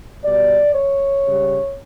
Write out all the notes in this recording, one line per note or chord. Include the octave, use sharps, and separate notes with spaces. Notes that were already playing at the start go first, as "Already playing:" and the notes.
B2 G3 D5
C#5
C#3 G3